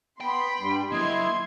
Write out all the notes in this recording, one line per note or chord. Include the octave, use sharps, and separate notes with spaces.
B3 G5 B5 C6
G2 G3
F#3 A#3 E4 D#5 C6 G#6